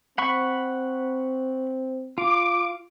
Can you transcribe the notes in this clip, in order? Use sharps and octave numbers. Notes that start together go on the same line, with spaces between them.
C4 F#5 B5 C#6
F4 D6